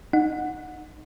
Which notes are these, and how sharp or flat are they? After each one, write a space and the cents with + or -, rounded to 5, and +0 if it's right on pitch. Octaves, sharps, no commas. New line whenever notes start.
D#4 -15 F#5 -10